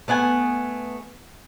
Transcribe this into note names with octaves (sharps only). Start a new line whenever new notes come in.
A3 B3 F#5 G#5